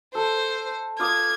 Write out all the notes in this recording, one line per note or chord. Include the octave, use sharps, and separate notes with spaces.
A4 C5
F4 D6 D#6 G#6